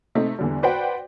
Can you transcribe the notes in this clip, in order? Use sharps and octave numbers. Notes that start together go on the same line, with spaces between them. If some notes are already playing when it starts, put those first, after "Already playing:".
C3 A3 C4 D#4
E2 D3 G3
F#4 B4 C5 D5 F#5 G5